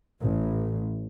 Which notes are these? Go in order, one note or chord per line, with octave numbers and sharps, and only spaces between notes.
A1